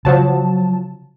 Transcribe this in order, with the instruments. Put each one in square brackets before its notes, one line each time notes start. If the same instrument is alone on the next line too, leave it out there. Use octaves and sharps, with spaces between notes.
[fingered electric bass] C#3 [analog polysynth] F3 F#3 A5